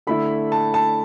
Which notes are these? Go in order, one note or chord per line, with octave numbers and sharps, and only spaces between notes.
D3 A3 E4 B5
A5
A5